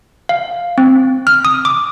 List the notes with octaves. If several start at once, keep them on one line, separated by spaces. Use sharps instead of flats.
F5
C4
F6
D#6
D6